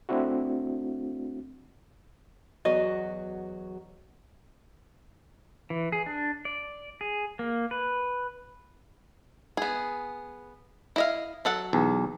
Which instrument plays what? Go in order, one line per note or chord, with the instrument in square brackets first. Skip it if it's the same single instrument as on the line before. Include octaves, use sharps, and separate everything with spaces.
[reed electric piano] A3 C4 D4 E4 F#4
[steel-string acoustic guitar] E2 F#3 F#4 [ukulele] D#5
[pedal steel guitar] E3
G#4
D4
D5
G#4
A#3
B4
[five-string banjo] B3 G#4
E4 D#5 F5
F#3 A4 F#5
[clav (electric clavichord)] B1 E2